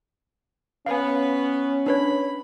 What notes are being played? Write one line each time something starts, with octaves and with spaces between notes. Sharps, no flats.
B3 C#4 B4 F5 G#5
D4 B4 C#5 B5